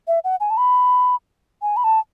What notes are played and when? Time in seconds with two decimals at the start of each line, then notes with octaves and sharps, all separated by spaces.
0.08 E5
0.24 F#5
0.40 G#5
0.50 A5
0.57 B5
1.62 G#5
1.77 B5
1.84 A5